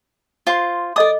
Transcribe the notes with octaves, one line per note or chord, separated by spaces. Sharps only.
F4 C5 C6
A4 D5 D#5 D6 D#6